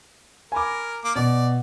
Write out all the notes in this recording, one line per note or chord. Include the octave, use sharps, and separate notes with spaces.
A#4 G#5 B5 D6
A#3 D6
B2 D5